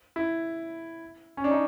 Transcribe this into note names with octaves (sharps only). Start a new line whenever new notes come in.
E4
C#4
D4
D#4